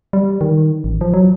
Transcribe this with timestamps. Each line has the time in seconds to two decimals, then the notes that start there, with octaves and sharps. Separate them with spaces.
0.13 G3
0.41 D#3
0.84 A1
1.01 F3
1.14 F#3